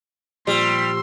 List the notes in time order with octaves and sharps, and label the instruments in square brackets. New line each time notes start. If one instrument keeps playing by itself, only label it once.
[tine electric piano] A#2 F3 [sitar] G3 [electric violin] C6 E6